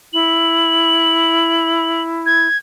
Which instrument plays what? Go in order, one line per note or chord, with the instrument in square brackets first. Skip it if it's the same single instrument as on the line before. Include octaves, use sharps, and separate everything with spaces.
[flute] E4 [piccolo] F#7
[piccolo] G#6